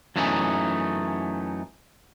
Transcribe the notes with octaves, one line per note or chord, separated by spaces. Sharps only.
F#2 E3 A3 C#4 D#4